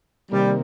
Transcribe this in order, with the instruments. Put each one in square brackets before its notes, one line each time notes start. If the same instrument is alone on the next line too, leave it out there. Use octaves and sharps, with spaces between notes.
[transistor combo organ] C3 D#3 A#3 [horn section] G3